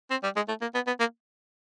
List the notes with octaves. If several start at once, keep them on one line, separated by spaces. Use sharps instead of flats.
C4
G3
G#3
A3
A#3
B3
B3
A#3